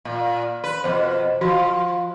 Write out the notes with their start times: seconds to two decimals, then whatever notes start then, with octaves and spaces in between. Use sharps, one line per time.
0.05 A#2
0.64 B4
0.84 F2 B2 C5
1.41 F3 F#4 C6